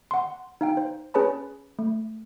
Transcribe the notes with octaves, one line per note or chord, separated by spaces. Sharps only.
F#5 C6
D#4 F5 G5
C5
C#4 G#4 B4 C#5 A5 B5
A3